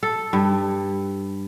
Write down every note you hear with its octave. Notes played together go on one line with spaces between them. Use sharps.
A4
G2